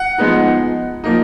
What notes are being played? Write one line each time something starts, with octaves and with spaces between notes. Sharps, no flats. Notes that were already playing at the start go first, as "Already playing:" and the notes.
Already playing: F#5
F3 G#3 B3 D#4
F3 A#3 D#4